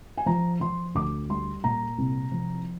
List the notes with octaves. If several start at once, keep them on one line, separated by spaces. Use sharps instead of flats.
G#5
F3 A#5
F3 C6
D2 D6
G3 C6
A#2 A#5
C2
F3